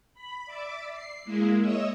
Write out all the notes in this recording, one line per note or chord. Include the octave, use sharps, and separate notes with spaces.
B5
D5 E5 D6
C7
G#3 A#3 E4
C#5 D#5 E5 E6